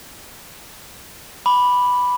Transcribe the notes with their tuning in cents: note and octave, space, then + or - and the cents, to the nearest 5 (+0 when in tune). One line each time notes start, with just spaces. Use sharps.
B5 +0 D6 +0